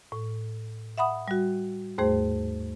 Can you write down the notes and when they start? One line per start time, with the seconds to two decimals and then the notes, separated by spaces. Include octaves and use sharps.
0.12 A2
0.98 E5 F#5 B5 D#6
1.28 G3 F#4
1.98 D#2 G#2 A3 G#4 C5